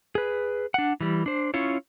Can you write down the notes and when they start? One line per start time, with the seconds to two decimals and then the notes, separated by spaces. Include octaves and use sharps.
0.15 G#4 B4
0.74 D4 F#5
1.01 E3 G3
1.26 D4 C5
1.54 C#4 E4 F4 C#5